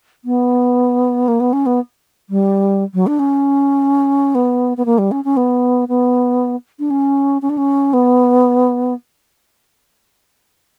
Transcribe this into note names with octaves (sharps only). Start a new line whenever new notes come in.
B3
A#3
B3
C#4
B3
G3
F#3
D4
C#4
B3
B3
A#3
G3
C#4
C#4
B3
B3
D4
C#4
C#4
D4
C#4
B3